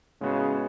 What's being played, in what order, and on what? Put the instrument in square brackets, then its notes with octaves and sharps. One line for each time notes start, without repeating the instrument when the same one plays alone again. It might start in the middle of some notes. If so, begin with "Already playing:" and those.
[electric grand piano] A2 G#3 B3 F#4 [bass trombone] C#3